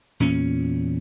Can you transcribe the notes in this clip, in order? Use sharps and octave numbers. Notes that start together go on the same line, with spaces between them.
E2 A#2 C#4